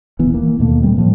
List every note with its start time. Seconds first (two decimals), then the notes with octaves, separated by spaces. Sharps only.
0.19 D#1 E3 B3
0.34 A#3
0.59 D#2 B2 A3 A#3
0.82 A#2 E3 G3 C4
0.96 A2 F3 G3